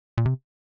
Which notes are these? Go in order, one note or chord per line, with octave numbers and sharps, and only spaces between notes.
A#2
C3